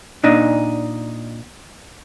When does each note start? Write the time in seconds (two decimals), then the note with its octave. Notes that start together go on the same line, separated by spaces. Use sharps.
0.24 A#2 D4 D#4